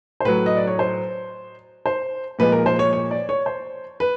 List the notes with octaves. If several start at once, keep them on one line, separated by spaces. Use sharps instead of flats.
C5
A2 F#3 B4
D#5
D5
C#5
C5
C5
A#2 F3 G#3 B4
A#4
C5
C#5
C#5
D5
C#5
C5
B4